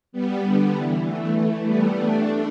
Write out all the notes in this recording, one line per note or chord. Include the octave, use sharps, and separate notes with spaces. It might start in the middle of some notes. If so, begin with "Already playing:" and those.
G3 B3
D3 G3
E3
E3 A3
G3 B3
A3 D4